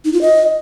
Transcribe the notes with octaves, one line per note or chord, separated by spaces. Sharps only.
D#4
F4
D#5